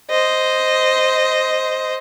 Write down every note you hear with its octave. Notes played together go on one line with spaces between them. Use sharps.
C5 D#5